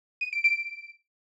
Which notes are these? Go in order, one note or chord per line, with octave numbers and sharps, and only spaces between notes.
D#7
D7
D7